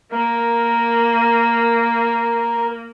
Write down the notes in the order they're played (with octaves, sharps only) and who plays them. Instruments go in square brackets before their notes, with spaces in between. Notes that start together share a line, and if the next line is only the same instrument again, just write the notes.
[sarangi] A#3 [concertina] A#4